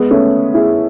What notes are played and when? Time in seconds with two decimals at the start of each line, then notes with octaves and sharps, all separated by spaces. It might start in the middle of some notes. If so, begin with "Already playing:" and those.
Already playing: G#3 B3
0.10 A3 C#4
0.54 E4 G#4